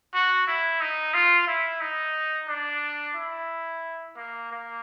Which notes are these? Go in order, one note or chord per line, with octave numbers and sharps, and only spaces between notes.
F#4
E4
D#4
F4
E4
D#4
D4
E4
A#3
A#3